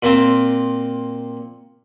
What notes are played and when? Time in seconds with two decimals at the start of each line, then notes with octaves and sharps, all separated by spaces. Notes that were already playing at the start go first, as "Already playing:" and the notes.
0.03 A#2 A#3 C4